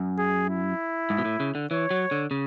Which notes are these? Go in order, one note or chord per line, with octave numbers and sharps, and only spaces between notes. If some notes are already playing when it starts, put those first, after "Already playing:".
Already playing: F#2
G#4
E4
G#2
B2
A2
C#3
D3
E3 C#5
F#3
D3
C#3